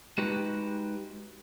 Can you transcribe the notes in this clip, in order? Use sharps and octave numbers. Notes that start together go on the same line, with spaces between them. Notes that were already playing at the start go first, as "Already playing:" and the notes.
G#3 D#4 F#4 G4 B4